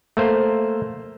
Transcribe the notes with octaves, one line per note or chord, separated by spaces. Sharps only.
A3 A#3 C5